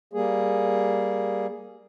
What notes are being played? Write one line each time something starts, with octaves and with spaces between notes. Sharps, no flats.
G3 A#3 G#4